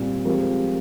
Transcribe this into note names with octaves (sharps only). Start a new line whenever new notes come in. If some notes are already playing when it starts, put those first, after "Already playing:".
Already playing: A#2 G3 C4
F3 G#3 C4 G4 A#4